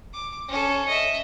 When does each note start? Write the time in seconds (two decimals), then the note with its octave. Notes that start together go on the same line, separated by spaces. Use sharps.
0.13 D6
0.48 C#4 A4
0.87 D#5 E5